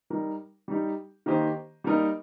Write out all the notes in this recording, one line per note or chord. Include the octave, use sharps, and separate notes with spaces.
G3 D#4 A#4
G3 D#4 G4
D#3 A#3 G4 C5 D#5
G3 A#3 D#4 A#4 D#5